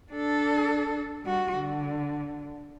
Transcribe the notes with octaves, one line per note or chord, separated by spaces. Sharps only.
D4 A4
G3 F#4
D3